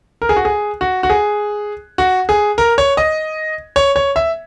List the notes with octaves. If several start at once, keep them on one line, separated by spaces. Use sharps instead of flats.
A#4
G#4
F#4
G#4
F#4
F#4
G#4
F#4
G#4
A#4
C#5
D#5
C#5
C#5
E5